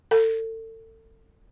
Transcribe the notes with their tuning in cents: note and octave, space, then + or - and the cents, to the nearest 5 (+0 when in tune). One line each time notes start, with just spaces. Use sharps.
A4 +35